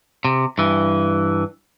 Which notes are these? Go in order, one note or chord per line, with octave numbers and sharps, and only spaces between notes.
C3
G2 E3